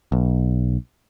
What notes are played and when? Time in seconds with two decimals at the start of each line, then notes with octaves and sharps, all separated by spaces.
0.12 B1